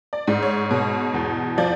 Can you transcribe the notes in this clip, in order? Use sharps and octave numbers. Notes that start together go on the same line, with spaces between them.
D5
G#2
C#5
B2
E2
F3 D5